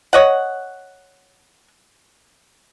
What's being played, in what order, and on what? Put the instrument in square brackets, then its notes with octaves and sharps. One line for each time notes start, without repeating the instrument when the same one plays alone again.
[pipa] C#5 D#5 F#5